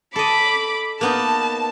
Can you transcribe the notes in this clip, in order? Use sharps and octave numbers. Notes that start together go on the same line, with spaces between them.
A4 D#5 B5 D6
A#3 B3 D#4 A5